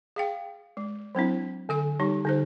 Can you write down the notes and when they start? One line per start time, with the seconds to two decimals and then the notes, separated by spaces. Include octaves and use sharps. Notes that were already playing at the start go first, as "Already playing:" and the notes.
0.16 G#4 F5 G5
0.77 G#3
1.15 F#3 C4 D4 E4
1.69 D3 A4 G#5
2.00 G3 D#4 G4
2.25 D3 D#4 C5